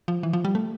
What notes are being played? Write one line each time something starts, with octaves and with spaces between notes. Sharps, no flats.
F3
E3
F3
G3
A3